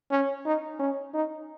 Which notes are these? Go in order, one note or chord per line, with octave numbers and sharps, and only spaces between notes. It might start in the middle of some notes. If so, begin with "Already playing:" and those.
C#4
D#4
C#4
D#4